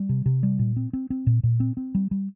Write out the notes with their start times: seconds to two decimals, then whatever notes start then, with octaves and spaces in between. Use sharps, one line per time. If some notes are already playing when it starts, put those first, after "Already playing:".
Already playing: G3
0.09 C3
0.26 C3
0.43 G3
0.59 A#2
0.77 C4
0.93 C4
1.10 C4
1.27 A#2
1.43 A#2
1.60 C4
1.77 C4
1.95 G3
2.11 G3